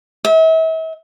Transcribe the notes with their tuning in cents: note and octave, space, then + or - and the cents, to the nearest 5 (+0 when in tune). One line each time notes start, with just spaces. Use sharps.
E5 -40